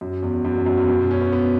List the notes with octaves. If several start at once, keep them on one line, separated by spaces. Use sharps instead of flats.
F#2
E2
F#2
E2
F#2
E2
F#2
B2
C#4
B3
B3